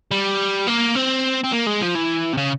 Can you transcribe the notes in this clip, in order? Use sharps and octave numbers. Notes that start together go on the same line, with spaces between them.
G3
A#3
C4
C4
A#3
G#3
F3
E3
C3
C#3